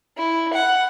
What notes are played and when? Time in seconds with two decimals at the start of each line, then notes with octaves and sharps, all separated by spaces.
0.18 E4
0.53 F#5